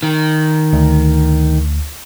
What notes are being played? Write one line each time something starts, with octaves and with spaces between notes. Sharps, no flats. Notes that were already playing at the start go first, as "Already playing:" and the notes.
D#3
D2